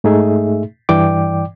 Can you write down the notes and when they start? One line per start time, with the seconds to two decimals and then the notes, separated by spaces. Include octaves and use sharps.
0.04 G#2 A3 D#4 G#4 E5
0.89 G2 E3 D5 G5 D6